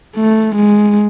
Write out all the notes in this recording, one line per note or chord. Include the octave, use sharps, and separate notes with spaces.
A3
G#3